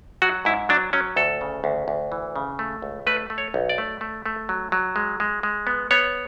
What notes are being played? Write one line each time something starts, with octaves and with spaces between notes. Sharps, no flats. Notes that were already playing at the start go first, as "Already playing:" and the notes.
F#3 F#4
G#2 E4
F#3 D4
F#3 C#4
D2 A4
C#3
D2
D2
E3
C#3
A3
C#2
A3 B4
A3
C#5
B1
D5
A3
A3
A3
F#3
F#3
G#3
G#3
G#3
B3
B3 C#5